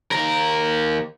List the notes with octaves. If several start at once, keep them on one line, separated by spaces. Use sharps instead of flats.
D#2 A#4